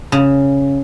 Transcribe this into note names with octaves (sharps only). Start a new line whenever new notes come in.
C#3